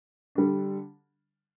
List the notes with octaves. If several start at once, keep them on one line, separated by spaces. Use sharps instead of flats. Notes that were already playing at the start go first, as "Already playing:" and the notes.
D3 G3 D4